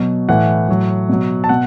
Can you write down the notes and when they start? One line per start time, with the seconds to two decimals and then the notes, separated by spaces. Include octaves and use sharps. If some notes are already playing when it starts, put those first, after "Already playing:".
Already playing: B2 F#3
0.29 A2 E3 F#5
0.68 A2 F#3
1.09 B2 F#3
1.44 A5
1.49 B2 F#5